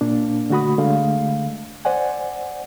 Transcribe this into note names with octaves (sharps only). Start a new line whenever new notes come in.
A#2 A#3 D4
D3 A3 F#4 B5 D#6
D3 G#3 A3 F5
C5 D5 F#5 G#5